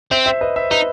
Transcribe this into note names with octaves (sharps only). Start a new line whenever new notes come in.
C4 C5 E5
C5 E5
B4 D#5
C5 E5
D#4 B4 D#5